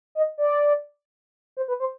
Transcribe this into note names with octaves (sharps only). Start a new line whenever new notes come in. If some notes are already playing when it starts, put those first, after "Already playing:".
D#5
D5
C5
B4
C5